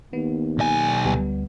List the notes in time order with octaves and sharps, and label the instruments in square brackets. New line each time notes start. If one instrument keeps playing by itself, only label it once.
[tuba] D#2 [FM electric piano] B3
[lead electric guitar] B1 G#5
[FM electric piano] D2 G3 B3